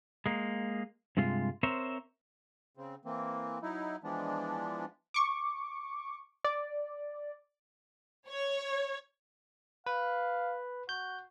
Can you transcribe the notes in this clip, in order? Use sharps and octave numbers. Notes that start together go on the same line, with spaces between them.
G#3 A#3
G2 C3 G#3 F4
C4 A#4 C5 C#5 E5
C#3 C4
E3 A#3 C4
F#3 D#4 E4
E3 F3 G#3 B3 D4
C#6 D6
D5
C#5
B4 F5
F#4 G6